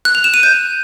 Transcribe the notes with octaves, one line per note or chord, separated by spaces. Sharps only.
F#6
F7
E7
D#7
G6